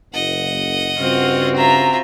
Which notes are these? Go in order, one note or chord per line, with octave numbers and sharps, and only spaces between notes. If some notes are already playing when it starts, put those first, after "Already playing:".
F#1 D#5 F#5
G2 C#3 C4 F4 F#4
F4 E5 A#5